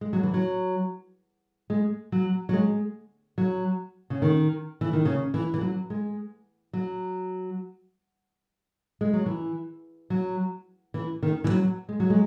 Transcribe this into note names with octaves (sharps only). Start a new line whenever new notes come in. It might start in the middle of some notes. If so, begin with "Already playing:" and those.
G#3
F#3
E3
F#3
G#3
F#3
F#3
G#3
F#3
C#3
D#3
E3
D#3
C#3
E3
E3
F#3
G#3
F#3
G#3
F#3
E3
F#3
E3
D#3
E3
F#3
G#3
F#3
G#3